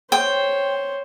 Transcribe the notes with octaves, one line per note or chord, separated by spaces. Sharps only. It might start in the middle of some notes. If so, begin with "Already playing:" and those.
C5 C#5 G5